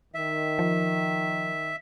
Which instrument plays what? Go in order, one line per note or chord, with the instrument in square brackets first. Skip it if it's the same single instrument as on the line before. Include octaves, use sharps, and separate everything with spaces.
[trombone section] D#3 [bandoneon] E5
[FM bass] F3